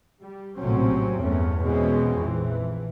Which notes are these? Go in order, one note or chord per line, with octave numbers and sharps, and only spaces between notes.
G3
A#1 A2 C3 F#3 C4 C#4
E2 G2 A3 C#4
B2 E3 G#3 C4 C#4
A#1 F2 E3